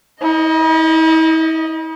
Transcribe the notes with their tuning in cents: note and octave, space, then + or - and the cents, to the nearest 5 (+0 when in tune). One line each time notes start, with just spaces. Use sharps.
E4 -45 D#5 +0